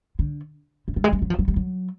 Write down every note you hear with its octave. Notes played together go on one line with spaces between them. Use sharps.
D3
D3
G3
G#3
G3
F#3
F3
F#3
G3
F#3